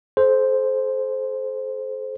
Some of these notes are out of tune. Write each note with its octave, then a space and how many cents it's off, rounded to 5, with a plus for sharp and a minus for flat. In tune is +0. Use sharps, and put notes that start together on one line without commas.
A4 -40 C5 +0